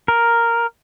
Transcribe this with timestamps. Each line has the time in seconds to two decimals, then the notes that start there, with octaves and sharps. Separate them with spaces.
0.08 A#4